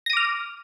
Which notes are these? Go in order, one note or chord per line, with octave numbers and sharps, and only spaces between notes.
D6 F6 A#6 D#7